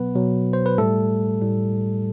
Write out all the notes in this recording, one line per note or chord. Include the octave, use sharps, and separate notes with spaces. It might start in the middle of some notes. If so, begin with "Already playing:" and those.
Already playing: B2 F#3 B3 B4
B2 F#3
C5
B4
A2 G3 A3 A4
A2 G3